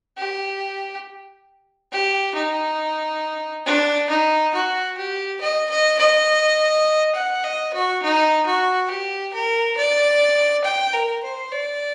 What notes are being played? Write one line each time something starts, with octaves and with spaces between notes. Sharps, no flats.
G4
G4
D#4
D4
D#4
F#4
G4
D#5
D#5
D#5
F#5
D#5
F#4
D#4
F#4
G4
A#4
D5
G5
A#4
C5
D5